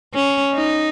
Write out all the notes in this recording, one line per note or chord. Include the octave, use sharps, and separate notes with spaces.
C#4
D#4